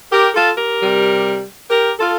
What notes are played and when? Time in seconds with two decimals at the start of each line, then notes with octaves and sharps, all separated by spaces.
0.12 G4 A#4
0.34 F4 A4
0.57 G4 A#4
0.80 C3 G3
1.70 G4 A#4
1.99 F4 A4